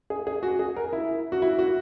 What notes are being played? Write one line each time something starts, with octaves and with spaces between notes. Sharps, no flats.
G#4
G#4
F#4
G#4
A#4
E4
F#4
E4
F#4